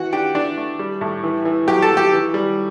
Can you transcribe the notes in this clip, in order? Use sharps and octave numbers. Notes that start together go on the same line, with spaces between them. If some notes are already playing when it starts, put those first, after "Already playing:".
Already playing: E3 F#4 F#5
D4 G4 G5
E3 D4 D5
A3
G3
A2
E3
E3
F#3 G4 G5
A4 A5
F#3
G4 G5
E3
G3